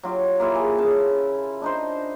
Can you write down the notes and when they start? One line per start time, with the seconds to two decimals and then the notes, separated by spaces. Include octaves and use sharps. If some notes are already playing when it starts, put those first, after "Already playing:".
0.03 F#3 F4 G4
0.40 A#3 E4 F4 G4
0.56 G#4
0.78 C#3 A5
1.62 D4 D#4 C5